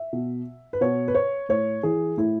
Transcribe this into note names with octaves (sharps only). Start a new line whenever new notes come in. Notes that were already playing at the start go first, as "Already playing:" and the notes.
Already playing: E5
B2
B4
B2 C#5
B4
C#5
A2 C#5
E3 G#4
A2 E4